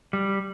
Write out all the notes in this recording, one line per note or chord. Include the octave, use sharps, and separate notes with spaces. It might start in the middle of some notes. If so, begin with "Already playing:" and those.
G3